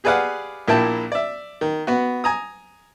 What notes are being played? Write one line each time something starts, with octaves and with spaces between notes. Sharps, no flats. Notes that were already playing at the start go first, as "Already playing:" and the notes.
G4 G#4 B4 D5 F5 F#5
A#1 A#2 A#3 E4 G5 A5
D5 E5
D#3
B3 F#4
G#5 A#5 D#6